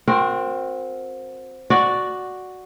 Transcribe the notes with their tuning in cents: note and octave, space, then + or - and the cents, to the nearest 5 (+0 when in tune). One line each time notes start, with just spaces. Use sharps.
C4 +0 F#4 -30 A#4 +0
F#4 +0 D5 +0